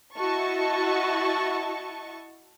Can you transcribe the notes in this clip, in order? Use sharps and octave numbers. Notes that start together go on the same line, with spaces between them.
E4 F#4 D#5 A5 C#6